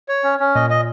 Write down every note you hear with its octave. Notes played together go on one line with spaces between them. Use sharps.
C#5
C#4
C#4
A#2 D#5
D#5